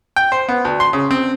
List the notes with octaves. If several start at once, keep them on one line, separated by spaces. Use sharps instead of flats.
G5
C5
B3
D2
C6
C#3
C4